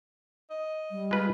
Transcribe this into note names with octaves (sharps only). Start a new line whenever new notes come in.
D#5
G3
G#3 F4 B4